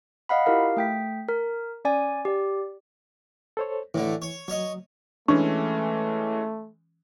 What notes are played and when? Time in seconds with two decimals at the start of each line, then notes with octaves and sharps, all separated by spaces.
0.29 D#5 F5 F#5 B5
0.46 E4 F4 G4 A#4 F5
0.77 A3 G5 B6
1.28 A#4
1.85 C#4 D5 G#5
2.25 G4 D5
3.57 A4 C5 C#5
3.94 A2 D3 E3
4.22 C#5
4.48 F#3 C#5 D#5
5.28 E3 G#3 A3 C#4 D4 C#6